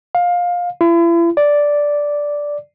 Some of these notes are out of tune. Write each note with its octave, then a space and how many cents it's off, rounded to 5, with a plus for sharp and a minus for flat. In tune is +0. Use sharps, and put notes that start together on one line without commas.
F5 +20
E4 +40
D5 -5